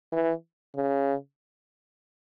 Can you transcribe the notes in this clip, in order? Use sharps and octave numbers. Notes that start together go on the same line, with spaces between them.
E3
C#3